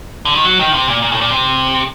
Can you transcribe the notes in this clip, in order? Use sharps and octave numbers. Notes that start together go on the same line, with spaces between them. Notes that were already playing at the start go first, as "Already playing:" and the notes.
D3
D#3
F#3
D#3
C3
A#2
A#2
A2
A#2
C3